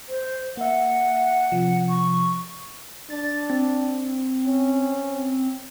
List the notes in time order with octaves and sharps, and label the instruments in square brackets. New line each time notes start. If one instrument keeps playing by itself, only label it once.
[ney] C5
[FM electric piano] A#3 E5 [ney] F#5
[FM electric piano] C3 F3
[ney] C#6
[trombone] D4 [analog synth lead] A6
[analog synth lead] C4
[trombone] C#4